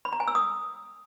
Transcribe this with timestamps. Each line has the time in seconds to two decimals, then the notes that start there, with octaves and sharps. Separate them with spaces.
0.05 B5
0.13 A#5
0.20 G#5
0.28 E6
0.35 D#6